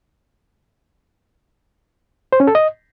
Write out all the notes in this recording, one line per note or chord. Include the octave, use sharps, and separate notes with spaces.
C5
C#4
A4
D#5